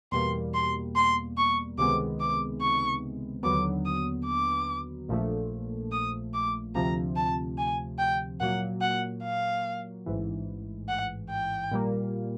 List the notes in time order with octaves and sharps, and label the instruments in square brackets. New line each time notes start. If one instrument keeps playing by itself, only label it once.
[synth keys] E2 B2 G3 A#3 [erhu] C6
[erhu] C6
C6
C#6
[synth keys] C#2 C3 D#3 G#3 B3 [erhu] D6
[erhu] D6
C#6
[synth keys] D#2 D3 F#3 B3 [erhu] D6
[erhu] D#6
D6
[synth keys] A#1 A#2 F3 A3
[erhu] D#6
D6
[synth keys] D2 C3 F3 [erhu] A#5
[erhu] A5
G#5
G5
[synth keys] A#2 F#3 A#3 [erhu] F#5
[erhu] F#5
F5
[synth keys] A1 G#2 E3
[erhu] F#5
G5
[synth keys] A#2 G3 A#3